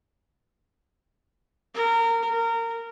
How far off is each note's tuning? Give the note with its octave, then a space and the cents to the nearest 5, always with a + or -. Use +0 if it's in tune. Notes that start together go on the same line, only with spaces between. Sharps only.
A#4 -25
A#4 -20